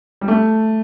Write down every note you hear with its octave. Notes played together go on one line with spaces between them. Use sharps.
G3
A3